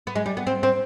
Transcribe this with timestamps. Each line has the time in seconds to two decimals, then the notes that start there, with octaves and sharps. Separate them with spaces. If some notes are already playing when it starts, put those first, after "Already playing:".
0.07 B3
0.15 G#3
0.26 G3
0.37 B3
0.47 C4
0.63 C4